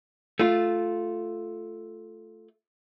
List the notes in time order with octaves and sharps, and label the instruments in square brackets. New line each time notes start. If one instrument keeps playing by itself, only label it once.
[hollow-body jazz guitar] A3 F4